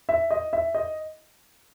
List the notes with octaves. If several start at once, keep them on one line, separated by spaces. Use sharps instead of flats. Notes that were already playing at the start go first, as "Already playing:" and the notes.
E5
D#5
E5
D#5